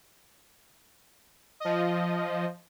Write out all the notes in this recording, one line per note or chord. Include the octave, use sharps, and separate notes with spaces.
F3 D#5